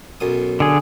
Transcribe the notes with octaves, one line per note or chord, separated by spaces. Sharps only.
B1 F#2 D#6
D3 G#4